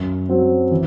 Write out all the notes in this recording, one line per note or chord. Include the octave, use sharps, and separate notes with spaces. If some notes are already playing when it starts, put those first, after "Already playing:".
Already playing: F#2
F#3 C4
E3